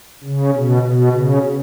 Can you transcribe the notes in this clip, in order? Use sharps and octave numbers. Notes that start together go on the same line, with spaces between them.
C#3
B2
B2
C#3